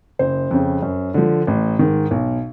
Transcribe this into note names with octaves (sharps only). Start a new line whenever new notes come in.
F#1 C5
F2 C#3
F#2
D3 F3
A1
G#2 D#3
B1